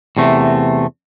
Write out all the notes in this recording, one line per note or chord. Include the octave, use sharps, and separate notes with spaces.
E2 C3 A3